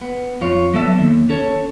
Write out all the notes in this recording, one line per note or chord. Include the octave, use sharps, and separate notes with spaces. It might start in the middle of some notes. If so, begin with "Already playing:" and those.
B3
F2 F4 C#5
F#3 B3 A4 D5 E5
D#2
C#4 A4 C#5